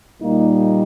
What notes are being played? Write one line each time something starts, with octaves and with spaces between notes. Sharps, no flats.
A#2 G3 A#3 D#4